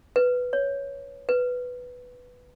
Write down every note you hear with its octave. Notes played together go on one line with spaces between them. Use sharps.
B4
C#5
B4